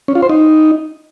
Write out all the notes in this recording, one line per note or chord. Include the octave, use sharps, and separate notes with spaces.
C#4
F4
C5
D#4